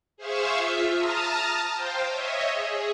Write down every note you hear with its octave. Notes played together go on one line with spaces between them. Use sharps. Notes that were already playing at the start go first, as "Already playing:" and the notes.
G#4 C5 E5 F5 C#6 E6
F4 E5
A5 A#5 D#6 F6
C5 F5 G5
C#5 D#5 E5
G#4